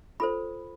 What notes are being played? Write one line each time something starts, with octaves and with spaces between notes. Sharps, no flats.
F4 A4 C5 B5